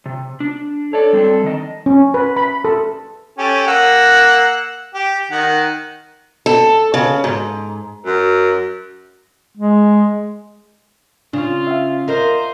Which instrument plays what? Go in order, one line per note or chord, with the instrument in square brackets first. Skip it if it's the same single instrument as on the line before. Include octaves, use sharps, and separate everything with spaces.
[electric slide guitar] C3
D4
[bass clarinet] A4 [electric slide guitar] C#5 D5
[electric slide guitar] G3 C4 D4
D#3 D#5
[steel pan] C#4
B4
B5
A4
[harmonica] C#4 G4 A4
A#3 F#5 E6
G4
D#3 F#5
[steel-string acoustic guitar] A4
C#3
G#2
[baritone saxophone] F#2
[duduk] G#3
[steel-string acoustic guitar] C#3 [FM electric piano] D4 [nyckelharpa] F4
[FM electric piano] E5 F5
[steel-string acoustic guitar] A#4 D#5 [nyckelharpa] C5